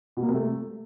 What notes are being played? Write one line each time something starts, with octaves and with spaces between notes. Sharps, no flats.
B2
A#3
C3
A3